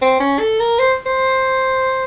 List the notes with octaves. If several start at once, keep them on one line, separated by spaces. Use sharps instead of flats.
C4
C#4
A4
A#4
C5
C5